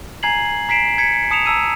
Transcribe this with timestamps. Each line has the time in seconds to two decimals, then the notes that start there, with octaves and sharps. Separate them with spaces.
0.23 G#5 A#5 G#6 C7 F#7
0.69 A#5 B6 C7 D7 E7
0.98 G#6 B6 C#7
1.31 A5 D#6 C#7 E7 F7
1.46 A5 A#5 E6 D#7